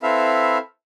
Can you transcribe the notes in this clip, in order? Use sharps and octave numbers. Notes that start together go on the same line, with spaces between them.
C4 E4 A4 B4 E5 F5